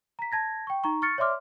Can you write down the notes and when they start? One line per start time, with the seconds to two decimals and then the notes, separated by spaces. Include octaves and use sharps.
0.19 A#5 B6
0.32 A5 G#6 A#6
0.67 G5 C#6
0.84 D#4 A#5 C#6
1.02 C#6 F6 A6 C#7
1.18 C#5 D5 E5 C6 D6 F6